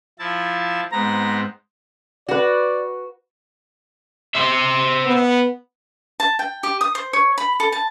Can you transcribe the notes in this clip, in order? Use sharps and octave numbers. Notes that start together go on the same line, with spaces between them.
F3 E4 A5
G#2 B3 C4 A#5
F#4 B4 D5
C5 E5
B3
A5
G5
G4
D#6
C5
C#5
B5
A4
A5